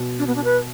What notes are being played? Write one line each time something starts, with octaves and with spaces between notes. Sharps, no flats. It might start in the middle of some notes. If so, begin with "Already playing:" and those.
Already playing: B2
D4
B3
D4
B4